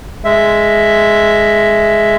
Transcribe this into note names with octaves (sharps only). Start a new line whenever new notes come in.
G#3 E5